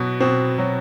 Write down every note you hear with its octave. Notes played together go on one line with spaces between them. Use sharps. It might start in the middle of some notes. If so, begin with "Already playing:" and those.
Already playing: B2 F#3 B3
B2 C4
F#3